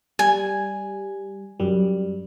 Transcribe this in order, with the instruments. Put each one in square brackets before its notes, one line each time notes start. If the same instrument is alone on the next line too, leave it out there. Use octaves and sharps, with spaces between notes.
[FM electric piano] G3 [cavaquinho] G#5
[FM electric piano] F#2 G3